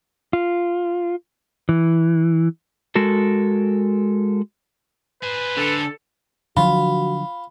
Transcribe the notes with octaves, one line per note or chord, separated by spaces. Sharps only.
F4
E3
G#3 F#4 A4 A#4
G#4 B4 C5
D3 A4
D3 F3 F#3 F4 F#4 B5